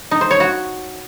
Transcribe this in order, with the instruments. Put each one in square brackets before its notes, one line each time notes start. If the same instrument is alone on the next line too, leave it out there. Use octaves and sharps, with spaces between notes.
[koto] D#4
C5
C#5
F#4